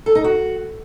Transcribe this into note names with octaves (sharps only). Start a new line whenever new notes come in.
A4
D#4
F#4